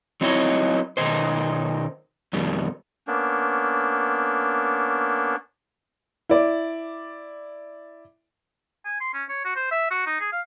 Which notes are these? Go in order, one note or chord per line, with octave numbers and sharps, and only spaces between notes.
F#3 C4 D#4 E4 C#5 D#5
B2 D#3 D#4 C5
F2 B2 D#3 G3
A#3 B3 C#4 D4
E4 D5
G#5
C6
C#4
C#5
F#4
C5
E5
F#4
D#4
G#4
F5